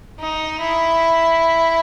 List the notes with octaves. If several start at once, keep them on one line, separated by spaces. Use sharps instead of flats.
D#4
E4